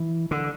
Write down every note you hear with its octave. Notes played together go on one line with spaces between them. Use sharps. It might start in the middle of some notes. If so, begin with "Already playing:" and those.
Already playing: E3
D3